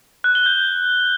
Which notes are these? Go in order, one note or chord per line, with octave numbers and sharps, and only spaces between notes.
F#6
G7
G6